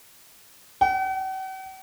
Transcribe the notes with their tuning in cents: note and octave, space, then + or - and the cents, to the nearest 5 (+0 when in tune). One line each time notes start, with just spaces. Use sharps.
F#5 +45